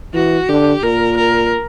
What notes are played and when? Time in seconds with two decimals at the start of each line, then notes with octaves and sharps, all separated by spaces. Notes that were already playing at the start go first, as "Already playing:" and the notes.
0.14 E3 F#4
0.49 D3 G4
0.83 A#2 A#4
1.17 A#4